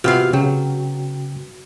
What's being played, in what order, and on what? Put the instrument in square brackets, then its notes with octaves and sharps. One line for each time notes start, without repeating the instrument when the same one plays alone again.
[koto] C3 B3 F5 [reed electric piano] F4 F#4 F6
[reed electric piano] C#3 G5 [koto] F#3